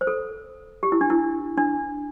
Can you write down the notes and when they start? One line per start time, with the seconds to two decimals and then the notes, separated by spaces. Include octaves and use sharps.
0.01 C5
0.07 A4
0.83 G4
0.92 E4
1.01 D4
1.10 E4
1.57 D4